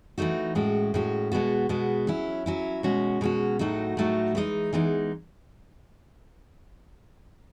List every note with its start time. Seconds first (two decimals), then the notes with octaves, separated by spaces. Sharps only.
0.18 E3 A3 D#4 F#4
0.55 A2 G#3 C#4 F#4
0.94 A2 G#3 C#4 F#4
1.32 B2 G#3 B3 F#4
1.69 B2 G#3 B3 F#4
2.07 F#3 C#4 E4
2.46 F#3 C#4 E4
2.83 B2 G#3 C#4 F#4
3.21 B2 G#3 C#4 F#4
3.59 A2 F#3 A3 D#4 F#4
3.97 A2 F#3 A3 D#4 F#4
4.35 E3 G#3 B3 D#4
4.73 E3 G#3 B3 D#4